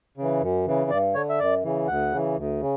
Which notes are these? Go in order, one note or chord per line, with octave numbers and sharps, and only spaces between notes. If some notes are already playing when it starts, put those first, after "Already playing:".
C#3 E3
F#2
C#3 E3
G2 D5
D3 C#5
E5
F#2 D5
C#3 E3
D2 F#5
C#3 E3
D2
C#3